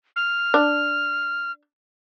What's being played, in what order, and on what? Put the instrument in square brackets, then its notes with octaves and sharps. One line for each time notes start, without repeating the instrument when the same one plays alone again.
[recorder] F6
[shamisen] D4